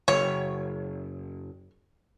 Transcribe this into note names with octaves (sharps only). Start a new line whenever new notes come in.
F#1 C#5